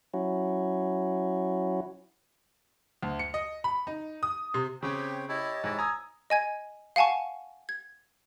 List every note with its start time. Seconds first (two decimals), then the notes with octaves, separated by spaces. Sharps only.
0.14 F#3 C#4 E4 F#4
3.02 D2
3.19 C#7
3.34 D#5
3.64 B5
3.87 D#4
4.23 D#6
4.54 C3
4.83 C#3 C4 G4 C#5 G5
5.29 E4 G4 C#5 D#5 A5
5.64 G#2 E4
5.79 G#5 A#5 D#6 E6
6.30 D#5 G#5 G#6
6.96 F5 F#5 G#5 A5 C#6
7.69 G#6